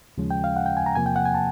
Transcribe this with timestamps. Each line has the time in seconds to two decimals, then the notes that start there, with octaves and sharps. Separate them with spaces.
0.18 D#2 C#3 F3 G#3 C#4
0.31 G5
0.44 F5
0.56 F#5
0.66 G5
0.77 G#5
0.86 A#5
0.95 E2 C3 F3 A#3 G#5
1.06 G5
1.16 F#5
1.25 G#5
1.35 A5